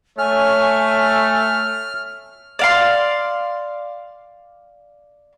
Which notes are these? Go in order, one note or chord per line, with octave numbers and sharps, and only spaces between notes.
A3 C#5 G#5 F6
D5 F5 C6